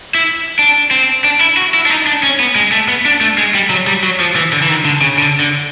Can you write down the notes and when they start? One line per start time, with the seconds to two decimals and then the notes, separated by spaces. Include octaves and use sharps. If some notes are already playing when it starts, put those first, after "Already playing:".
0.15 E4
0.59 D4
0.91 C4
1.24 D4
1.41 E4
1.57 F#4
1.74 E4
1.86 D4
1.90 D#4
2.07 D4
2.23 C#4
2.40 B3
2.55 G#3
2.72 A3
2.88 B3
3.05 D4
3.21 A3
3.38 G#3
3.54 G3
3.70 F#3
3.87 G3
4.03 F#3
4.20 F3
4.36 E3
4.53 D3
4.62 E3
4.69 D#3
4.85 D3
5.02 C#3
5.18 D3
5.40 D3